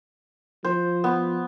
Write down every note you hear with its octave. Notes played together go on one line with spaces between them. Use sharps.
F3 C5
B3